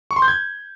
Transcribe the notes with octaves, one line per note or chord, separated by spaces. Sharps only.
C#6
C6
G6
G#6